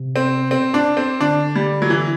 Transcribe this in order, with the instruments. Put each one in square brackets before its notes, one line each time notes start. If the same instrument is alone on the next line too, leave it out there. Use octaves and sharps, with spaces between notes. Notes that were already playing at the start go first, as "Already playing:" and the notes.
Already playing: [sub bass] C3
[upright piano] C4
C4
D4
C4
[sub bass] D3 [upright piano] D4
[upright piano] G3
F#3
E3